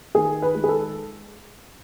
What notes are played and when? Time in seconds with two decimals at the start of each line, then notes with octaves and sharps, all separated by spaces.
0.15 D#3 G#4
0.42 B4
0.55 G#3
0.64 G#4
0.69 A4